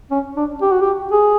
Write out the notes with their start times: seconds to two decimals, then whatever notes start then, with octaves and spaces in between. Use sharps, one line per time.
0.11 C#4
0.37 D4
0.62 G4
0.71 F#4
0.81 G4
1.12 G#4